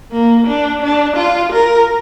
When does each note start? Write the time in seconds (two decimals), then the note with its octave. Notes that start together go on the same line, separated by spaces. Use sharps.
0.12 A#3
0.47 D4
0.82 D4
1.17 F4
1.52 A#4